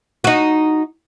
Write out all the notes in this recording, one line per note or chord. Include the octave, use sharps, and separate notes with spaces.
D#4 F#4